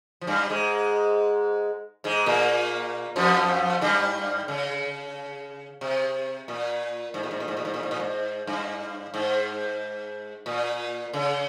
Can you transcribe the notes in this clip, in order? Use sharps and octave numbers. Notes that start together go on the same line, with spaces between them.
F3
G2 G3
G#2 G#3
G#2 G#3
A#2 A#3
F2 F3
G2 G3
C#3
C3
A#2
G#2
A#2
G#2
A#2
G#2
A#2
G#2
A#2
G#2
A#2
G#2
G2
G#2
A#2
C#3